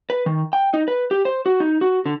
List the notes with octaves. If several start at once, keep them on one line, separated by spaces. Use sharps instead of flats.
B4
D#3
G5
D#4
B4
G4
C5
F#4
D#4
F#4
D3